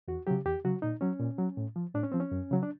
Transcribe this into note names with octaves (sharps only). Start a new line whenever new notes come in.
E2 F#4
C#3 F#3 G4
E2 G4
C#3 F#3 F#4
A#2 D#4
F#3 C#4
A#2
F#3
A2
F3
A2 D4
C#4
F3 C4
C#4
F#2
C#3 F#3
D4